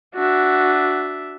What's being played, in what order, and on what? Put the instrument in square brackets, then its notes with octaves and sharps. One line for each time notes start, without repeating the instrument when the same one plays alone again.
[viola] D4 E5 [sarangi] F#4